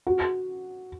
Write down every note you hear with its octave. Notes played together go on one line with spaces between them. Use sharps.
F#4